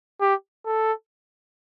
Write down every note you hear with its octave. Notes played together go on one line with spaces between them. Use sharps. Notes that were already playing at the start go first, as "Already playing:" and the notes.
G4
A4